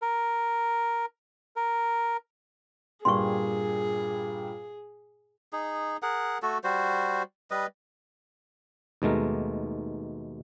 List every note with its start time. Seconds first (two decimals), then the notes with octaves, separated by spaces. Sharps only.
0.02 A#4
1.56 A#4
3.05 G2 A#2 G3 G#4 C6 C#6
5.53 D#4 G#4
6.02 G#4 A#4 F#5
6.42 A3 F#4 A4
6.64 G3 F#4 C5
7.51 G3 B4 D#5
9.02 D#2 B2 G#3 A3 A#4